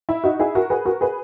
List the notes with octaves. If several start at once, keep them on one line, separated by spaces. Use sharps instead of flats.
E4
D#4 F#4
E4 G#4
F#4 A#4
G#4 B4
F#4 A#4
G#4 B4